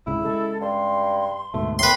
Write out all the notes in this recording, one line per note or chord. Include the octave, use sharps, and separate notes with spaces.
C#2 G#2 C#3 E4
C#3 G#3 A4
G2 C6
D2 G#2 B2 A3
A2 B4 G5 C6